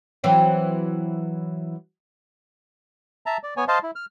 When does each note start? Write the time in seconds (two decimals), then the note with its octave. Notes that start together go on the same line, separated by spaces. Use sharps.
0.24 E3 F#3 C4
3.26 E5 A5 A#5
3.43 D5
3.57 B3 C#5 G#5
3.68 C5 D#5 F5 A5
3.83 E4
3.96 F6